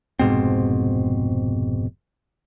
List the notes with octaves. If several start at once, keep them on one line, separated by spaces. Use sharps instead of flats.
F1 G#2 B2 C4